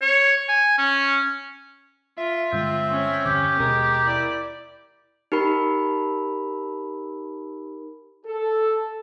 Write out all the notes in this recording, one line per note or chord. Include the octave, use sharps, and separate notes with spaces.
C#5
G#5
C#4
F4 E5
G2 D3 G#3 C4
C#4
E2 G2 D3 G4
D#2 B2 G#3 A#4
E4 D5
D#4 G4 A#4 B5
A4